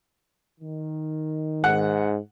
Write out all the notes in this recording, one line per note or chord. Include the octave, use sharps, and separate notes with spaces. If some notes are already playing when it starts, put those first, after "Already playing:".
D#3
G#2 F#5